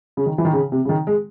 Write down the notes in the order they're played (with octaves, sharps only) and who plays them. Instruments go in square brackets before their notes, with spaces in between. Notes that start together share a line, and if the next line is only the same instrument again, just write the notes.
[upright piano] C#3
D#3
E3
D#3
C#3
C3
C#3
D#3
G#3